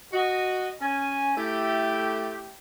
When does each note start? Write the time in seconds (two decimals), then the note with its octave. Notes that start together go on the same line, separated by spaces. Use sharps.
0.13 F#4 D#5
0.80 C#4 G#5
1.36 A3 E4 G4